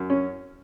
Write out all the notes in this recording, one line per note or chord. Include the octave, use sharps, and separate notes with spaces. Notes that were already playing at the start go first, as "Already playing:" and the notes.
Already playing: F#2
C#4